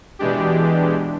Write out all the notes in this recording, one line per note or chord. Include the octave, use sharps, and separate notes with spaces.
B2 E3 G#3 D4 G4